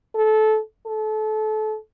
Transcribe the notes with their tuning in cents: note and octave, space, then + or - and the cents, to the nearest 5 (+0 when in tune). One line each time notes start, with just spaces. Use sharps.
A4 -20
A4 -30